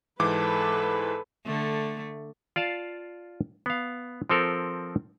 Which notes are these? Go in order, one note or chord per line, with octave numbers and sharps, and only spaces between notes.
G#2 E3 A4 B4 D6
D3 A3
F4 D5 F5 A5
B3 F5
F3 C4 A4 A#4